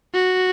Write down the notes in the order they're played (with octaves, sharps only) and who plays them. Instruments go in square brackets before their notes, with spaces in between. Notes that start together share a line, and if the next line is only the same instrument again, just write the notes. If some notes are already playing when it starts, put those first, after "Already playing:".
[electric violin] F#4